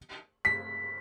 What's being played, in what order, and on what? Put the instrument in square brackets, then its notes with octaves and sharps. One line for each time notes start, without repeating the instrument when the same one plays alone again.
[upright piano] B6